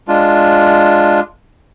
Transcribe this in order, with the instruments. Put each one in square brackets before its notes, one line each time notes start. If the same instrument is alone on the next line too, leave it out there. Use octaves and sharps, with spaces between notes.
[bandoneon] G#3 D4 F4